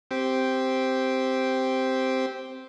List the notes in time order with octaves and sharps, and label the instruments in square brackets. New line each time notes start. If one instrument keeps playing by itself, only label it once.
[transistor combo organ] C4 G4